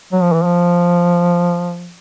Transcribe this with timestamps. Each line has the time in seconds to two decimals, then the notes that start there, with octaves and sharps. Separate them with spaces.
0.12 F#3
0.22 F3
0.33 E3
0.44 F3